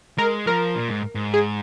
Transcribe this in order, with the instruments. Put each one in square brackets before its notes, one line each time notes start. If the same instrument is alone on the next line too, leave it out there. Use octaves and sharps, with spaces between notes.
[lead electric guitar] G#3 [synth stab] A#4
[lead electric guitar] F3 [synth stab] A#4
[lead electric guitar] A#2
G#2
G#2
[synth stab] G#4